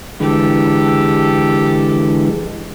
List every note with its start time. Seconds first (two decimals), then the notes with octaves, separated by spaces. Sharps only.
0.20 D3 E3 G#3 G4 A4